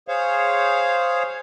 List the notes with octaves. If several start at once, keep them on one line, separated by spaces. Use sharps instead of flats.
G#4 C5 C#5 F5